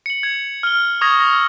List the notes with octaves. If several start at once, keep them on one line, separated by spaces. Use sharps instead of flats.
C#7 F#7
G#6
F6 G7
C#6 D#6 G#6 A#6
A#6
E6